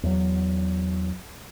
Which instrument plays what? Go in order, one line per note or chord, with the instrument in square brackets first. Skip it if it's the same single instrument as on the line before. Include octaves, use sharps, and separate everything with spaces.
[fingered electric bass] E2 F#3